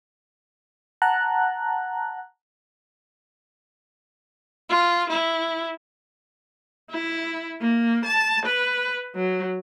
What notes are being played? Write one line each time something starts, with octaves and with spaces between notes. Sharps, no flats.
F#5 A5 A#5 F#6
F4
E4
E4
A#3
A5
B4
F#3